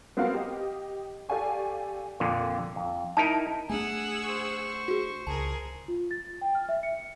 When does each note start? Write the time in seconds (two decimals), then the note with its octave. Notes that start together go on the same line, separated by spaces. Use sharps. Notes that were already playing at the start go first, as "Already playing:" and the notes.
0.17 B3 C4 F#4 A#4 F5 F#5
0.34 G4 D#5
1.29 G4 A4 D5 F5 G#5 C#6
2.20 F2 A#2 D3
2.76 F2
3.17 D#4 E4 A#4 A5
3.69 A3 C4 D4 G#4 F#5 G#5 E6
4.24 C5 C#6
4.88 F#4 G#4
5.27 C#2 G#4 A#4 A5
5.88 F4
6.11 A6
6.26 A6
6.41 G5
6.55 F6
6.69 E5
6.83 C#7